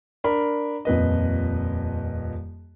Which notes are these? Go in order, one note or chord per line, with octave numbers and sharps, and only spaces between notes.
D4 A#4 B5
D#1 F2 B4 D#5